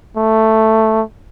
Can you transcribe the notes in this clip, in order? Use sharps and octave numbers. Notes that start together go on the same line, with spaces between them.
A3